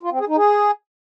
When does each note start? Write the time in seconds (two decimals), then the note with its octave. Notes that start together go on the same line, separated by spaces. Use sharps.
0.03 F4
0.11 C4
0.20 G#4
0.28 D#4
0.36 G#4